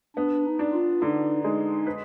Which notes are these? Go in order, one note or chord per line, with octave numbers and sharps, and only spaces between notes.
B3 D4
D#4
D4
F4
D3 D#4
G#3 D#4
B4